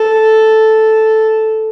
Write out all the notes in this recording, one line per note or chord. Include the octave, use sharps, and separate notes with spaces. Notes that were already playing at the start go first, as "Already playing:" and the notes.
Already playing: A4